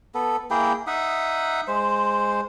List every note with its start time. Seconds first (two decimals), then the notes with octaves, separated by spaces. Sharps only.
0.15 B3 A4
0.51 A#3 E4 G#4 G5
0.87 D#4 E5 F#5 D#6
1.68 G#3 C5